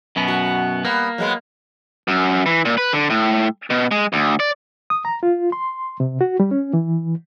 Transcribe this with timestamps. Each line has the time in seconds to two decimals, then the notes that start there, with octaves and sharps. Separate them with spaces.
0.16 F#2 B2 B3
0.28 F#4
0.85 G3 A#3 B3
1.18 F#3 G#3 B3
2.08 F#2
2.46 E3
2.65 A#2
2.78 B4
2.93 D3
3.10 A2
3.70 B2
3.91 G#3
4.13 D2
4.40 D5
4.90 D#6
5.05 A#5
5.23 F4
5.52 C6
6.00 C3
6.21 F#4
6.40 G3
6.51 C#4
6.73 E3